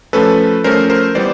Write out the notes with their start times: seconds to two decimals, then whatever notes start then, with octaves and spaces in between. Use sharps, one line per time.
0.13 F3 A3 C#4 A4 B4
0.64 F3 A3 C#4 A#4 C5
0.90 A#4 C5
1.15 E3 G3 B3 C5 D5